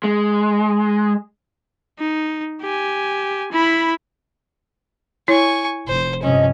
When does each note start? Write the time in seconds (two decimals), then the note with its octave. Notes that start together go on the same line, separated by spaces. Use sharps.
0.04 G#3
1.99 D#4
2.62 G4 G#5
3.52 E4 B5
5.28 E4 C#5 G#5 C#6
5.87 F1 C5
6.22 G2 C3 F3 C#4 D#5